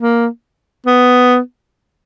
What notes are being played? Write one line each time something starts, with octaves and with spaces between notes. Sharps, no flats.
A#3
B3